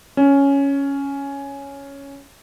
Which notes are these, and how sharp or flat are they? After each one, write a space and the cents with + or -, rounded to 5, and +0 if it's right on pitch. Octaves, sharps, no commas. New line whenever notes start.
C#4 +5